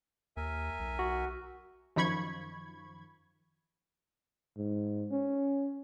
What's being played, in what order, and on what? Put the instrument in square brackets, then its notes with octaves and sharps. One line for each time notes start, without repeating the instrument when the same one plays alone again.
[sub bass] D#2 [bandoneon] A#4 E5 G#5
[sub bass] B1
[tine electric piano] F#4
[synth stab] F#2 D#3 F3 B5 C#6 G#6
[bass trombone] G#2
C#4